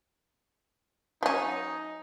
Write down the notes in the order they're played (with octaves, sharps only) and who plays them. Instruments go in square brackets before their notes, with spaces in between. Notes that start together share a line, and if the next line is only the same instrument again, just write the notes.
[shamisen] F#3 C#4 [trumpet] D#4